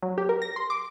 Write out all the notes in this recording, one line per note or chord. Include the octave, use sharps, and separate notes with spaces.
F#3
G4
A#4
A#6
C6
D6